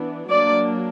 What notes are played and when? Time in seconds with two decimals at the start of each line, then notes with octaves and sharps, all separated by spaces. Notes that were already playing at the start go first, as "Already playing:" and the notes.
Already playing: E3 B3 D4
0.30 F#3 A#3 D4 D5